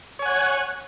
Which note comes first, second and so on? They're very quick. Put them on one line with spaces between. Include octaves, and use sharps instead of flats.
C#5 G#5 F#5